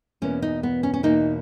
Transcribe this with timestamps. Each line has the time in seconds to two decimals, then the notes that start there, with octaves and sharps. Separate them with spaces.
0.22 E2 B2 A#3 C#4
0.42 D#4
0.63 B3
0.83 C#4
0.94 C#4
1.03 E2 B2 A#3 D#4